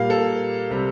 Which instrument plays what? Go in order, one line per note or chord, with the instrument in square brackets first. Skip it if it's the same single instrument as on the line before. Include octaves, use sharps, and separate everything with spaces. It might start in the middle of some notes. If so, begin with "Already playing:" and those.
Already playing: [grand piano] A#2 G3 A#3 F5
A4
C3 G3